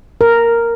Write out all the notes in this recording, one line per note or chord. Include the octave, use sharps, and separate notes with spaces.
A#4